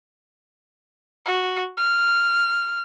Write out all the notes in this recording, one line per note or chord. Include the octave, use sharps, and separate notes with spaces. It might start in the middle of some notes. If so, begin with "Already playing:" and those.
F#4
F6